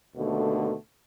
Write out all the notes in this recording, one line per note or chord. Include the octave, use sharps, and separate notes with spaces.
D#2 B2 D3 A3